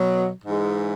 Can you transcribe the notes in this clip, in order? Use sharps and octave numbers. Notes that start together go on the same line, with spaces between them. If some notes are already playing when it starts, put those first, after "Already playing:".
Already playing: B2 F#3
G#2 E3 G#3